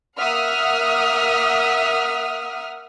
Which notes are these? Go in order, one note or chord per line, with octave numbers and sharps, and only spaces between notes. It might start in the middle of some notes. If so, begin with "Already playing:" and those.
A#3 E5 F#5 D#6 F6